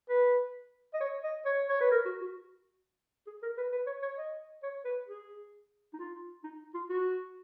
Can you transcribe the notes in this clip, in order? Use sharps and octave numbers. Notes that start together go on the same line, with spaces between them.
B4
D#5
C#5
D#5
C#5
C#5
B4
A#4
F#4
F#4
G#4
A#4
B4
B4
C#5
C#5
D#5
C#5
B4
G#4
D#4
F4
D#4
F4
F#4